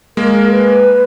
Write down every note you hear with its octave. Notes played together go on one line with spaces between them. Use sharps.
G#3 A#3 A#4
B4